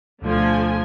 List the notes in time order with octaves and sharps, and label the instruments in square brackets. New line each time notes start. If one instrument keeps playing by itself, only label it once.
[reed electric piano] D2 B2 A3 [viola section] D3 F3 G#5